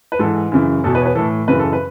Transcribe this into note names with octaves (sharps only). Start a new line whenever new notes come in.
B4
G#2 E3 A4
F#2 C#3 E3
E2 B2 A4
B4
C#5
B4
A2 E3 A4
F#2 C#3 E3 B4
A4
B4